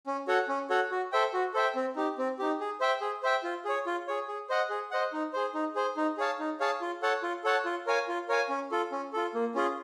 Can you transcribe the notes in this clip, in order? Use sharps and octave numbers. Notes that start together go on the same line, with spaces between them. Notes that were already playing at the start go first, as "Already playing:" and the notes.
C#4
F#4 A4 C#5 F#5
C#4
F#4 A4 C#5 F#5
F#4
A4 C5 E5 G5
F#4
A4 C5 E5 G5
C4
D#4 G4
C4
D#4 G4
G#4
C5 E5 G5
G#4
C5 E5 G5
F4
G#4 C#5
F4
G#4 C#5
G#4
C5 D#5 F#5
G#4
C5 D#5 F#5
D#4
G#4 C5
D#4
G#4 C5
D#4
G#4 C#5 F5 A5
D#4
G#4 C#5 F5 A5
F4
A4 C#5 F#5 A5
F4
A4 C#5 F#5 A5
F4
A#4 C#5 F5 G#5
F4
A#4 C#5 F5 G#5
C#4
F4 A4
C#4
F4 A4
A#3
C#4 F4 G#4